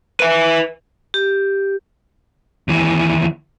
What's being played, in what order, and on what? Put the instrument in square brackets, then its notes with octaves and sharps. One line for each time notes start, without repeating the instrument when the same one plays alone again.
[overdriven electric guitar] B4 E5
[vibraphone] G4
[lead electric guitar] D#2 E3